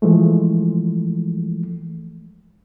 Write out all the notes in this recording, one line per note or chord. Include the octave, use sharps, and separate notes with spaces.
E3 F3 G#3 A3